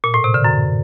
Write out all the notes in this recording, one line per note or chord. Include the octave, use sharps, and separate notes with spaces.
A#2
A2
C3
D3
F#2